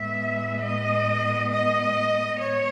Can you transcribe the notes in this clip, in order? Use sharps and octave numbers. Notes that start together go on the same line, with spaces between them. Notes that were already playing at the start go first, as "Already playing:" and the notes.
Already playing: A2 G#3 B3 E5
D#5
D#5
C#5